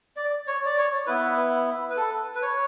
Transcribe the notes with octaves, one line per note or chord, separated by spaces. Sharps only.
D5
C#5
D5
C#5
B3 E4 B4
B4
A4
B4
C#5